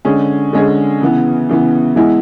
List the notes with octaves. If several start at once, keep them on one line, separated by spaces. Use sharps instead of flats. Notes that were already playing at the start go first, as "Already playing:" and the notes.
D3 G#3 C#4 G#4
D3 G#3 C#4 G#4
C#3 E3 B3
C#3 E3 B3
E3 G#3 B3 E4